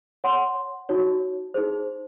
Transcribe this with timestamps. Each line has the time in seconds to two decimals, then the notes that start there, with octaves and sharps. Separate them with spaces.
0.24 C#5 F#5 C6
0.89 D#4 F#4 C#5
1.54 D#4 G#4 C5